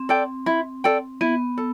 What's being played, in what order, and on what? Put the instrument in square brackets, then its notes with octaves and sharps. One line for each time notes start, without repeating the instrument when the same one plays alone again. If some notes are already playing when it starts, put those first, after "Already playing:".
Already playing: [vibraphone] C4
[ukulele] A4 D5 G5
E4
A4 D5 G5
[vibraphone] B3 [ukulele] E4
[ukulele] A4